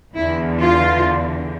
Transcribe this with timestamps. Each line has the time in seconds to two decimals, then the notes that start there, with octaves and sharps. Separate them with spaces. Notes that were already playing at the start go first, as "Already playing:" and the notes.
0.15 E2 D3 E4
0.61 F4